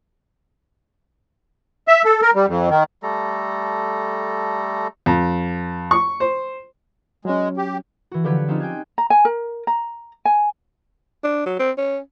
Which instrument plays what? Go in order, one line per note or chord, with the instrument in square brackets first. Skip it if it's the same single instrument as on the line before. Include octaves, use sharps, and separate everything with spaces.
[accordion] E5
A4
A#4
G3
F2
D#3
[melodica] G3 A3 A4 A#5
[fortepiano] F2
C#6
C5
[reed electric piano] F#3 C#4 [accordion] G#3
[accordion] G4
[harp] E3 F#4
D3 F3 F#3 G4 B4 C#5
F3 C4 C#4 D#4 F4
G5 G#5 F#6 G#6
[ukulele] A#5
G#5
A#4
A#5
G#5
[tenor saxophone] D4
F#3
C4
C#4